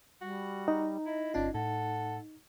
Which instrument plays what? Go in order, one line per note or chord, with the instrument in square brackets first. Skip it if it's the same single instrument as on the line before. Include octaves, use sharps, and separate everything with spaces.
[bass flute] G3 [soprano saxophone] F#4
[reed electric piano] D#4 [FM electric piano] A#5
[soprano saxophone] E4 [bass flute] D#5
[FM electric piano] G1 C#4 F4 [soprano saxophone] D4
[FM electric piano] A2 [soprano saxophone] A4 [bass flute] F#5